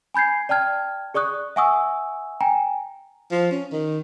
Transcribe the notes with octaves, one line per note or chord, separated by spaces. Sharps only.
G#5 B5 G6 G#6 C7
D5 G5 A5 F6 G#6
G#4 D5 C#6 D#6 F#6
E5 F#5 G#5 C#6 D#6 E6
G5 G#5 A#5
F3
C#4
D#3